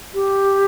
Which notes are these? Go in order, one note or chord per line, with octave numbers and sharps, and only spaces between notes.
G4